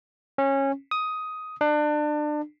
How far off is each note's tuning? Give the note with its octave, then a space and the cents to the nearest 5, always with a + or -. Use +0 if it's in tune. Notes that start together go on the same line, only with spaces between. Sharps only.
C#4 -20
D#6 +10
D4 +30